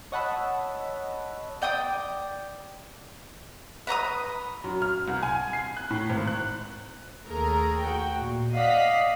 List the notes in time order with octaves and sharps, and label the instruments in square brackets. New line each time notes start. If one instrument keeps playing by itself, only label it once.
[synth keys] C#5 D#5 F#5 A5 B5 E6
[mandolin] D5 G5 D6 D#6
B4 A#5 D6 D#6
[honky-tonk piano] F#2
F6
C2
G#5
C7
F#6
A2
G#1
F#6
[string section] D#2 A3 G#4 A#4 A#5
F#4 G5
A#2
D5 D#5 F5 F#5 B6